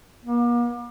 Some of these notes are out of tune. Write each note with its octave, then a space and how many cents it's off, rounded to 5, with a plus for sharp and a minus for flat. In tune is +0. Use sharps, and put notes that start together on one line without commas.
A#3 +40